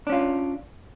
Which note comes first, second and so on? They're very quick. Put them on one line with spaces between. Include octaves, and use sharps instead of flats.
D4 C#4 F4